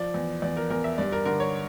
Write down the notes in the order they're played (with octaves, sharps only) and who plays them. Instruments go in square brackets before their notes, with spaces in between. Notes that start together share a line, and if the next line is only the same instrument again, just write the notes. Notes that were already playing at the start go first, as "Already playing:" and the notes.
Already playing: [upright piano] F3 D5
E2
E2 D5
A#4
E2 A#4
E5
G2 D5
A#4
D3 A#4
C#5